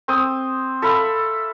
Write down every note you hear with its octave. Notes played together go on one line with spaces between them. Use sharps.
C4 C5 D#6
A4 E5 F5 B5